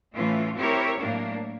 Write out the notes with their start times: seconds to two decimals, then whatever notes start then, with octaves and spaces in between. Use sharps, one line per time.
0.15 A2 E3 A3 C#4 F4
0.57 C4 E4 G4 A#4 C#5
0.99 A2 F#3 A#3 D4